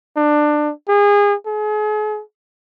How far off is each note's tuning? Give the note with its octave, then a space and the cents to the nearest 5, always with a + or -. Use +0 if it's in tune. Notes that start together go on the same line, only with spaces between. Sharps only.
D4 +20
G#4 -30
G#4 +40